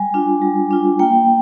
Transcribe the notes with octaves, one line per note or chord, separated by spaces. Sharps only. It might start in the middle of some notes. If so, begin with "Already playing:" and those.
Already playing: G3 G#5
D4 F4
G3
D4 F4
A#3 G5